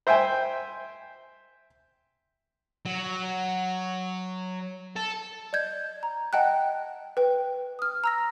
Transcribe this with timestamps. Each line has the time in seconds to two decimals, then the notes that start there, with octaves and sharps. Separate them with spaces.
0.07 C5 E5 G5 G#5
2.86 F#3
4.96 A4
5.53 D5 D#5 G6 G#6
6.03 A#5
6.33 D#5 F#5 G5 A5 F#6
7.17 B4 G5
7.79 D#6 F6
8.04 A#5 E6 A#6